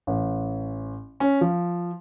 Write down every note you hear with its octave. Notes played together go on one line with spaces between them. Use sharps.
A1
C#4
F3